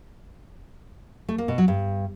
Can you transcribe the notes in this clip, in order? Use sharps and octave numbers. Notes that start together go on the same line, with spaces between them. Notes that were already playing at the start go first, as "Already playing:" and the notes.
A3
A#3
B2
F#3
G2